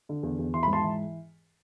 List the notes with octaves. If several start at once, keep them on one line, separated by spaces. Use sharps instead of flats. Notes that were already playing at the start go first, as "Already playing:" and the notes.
D3
E2
E2
E3 C6
B5
G#2
A5 C6
E3